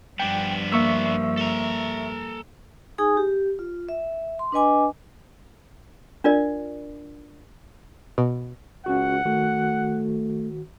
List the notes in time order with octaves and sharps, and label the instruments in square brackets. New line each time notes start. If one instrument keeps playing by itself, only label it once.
[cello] G2 F3 [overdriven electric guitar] B3 D4 [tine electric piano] G5
[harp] A#3 [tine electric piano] E5 C#6 E6
[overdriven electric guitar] A4 A#5
[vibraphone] D#4 G#4 G#5 D#6
G4
F4
E5
C6
D4 B4 D#5 G#5 D6
[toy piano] D4 F4 A#4 D5
[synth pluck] B2
[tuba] C#2 [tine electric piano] C#4 F#4 [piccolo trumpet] F#5
[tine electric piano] D#3 F#4 [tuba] A3